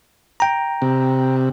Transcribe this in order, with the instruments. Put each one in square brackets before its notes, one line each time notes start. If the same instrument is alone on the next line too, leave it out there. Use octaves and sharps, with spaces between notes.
[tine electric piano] G5 A#5
[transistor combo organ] C3